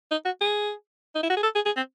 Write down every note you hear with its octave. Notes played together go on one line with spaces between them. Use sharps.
D#4
F#4
G#4
D#4
E4
F#4
G#4
A4
G#4
G#4
C4